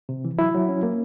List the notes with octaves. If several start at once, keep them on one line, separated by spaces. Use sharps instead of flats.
C3
E3
F#3 E4
F#3
C#4
A#3